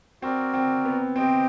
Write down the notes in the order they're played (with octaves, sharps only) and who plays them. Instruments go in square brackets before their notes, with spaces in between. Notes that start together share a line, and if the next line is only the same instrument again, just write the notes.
[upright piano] C4 [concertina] F#4 A#4 D5
[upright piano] C4
B3
[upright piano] C4 [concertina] G4 C5 D#5 G5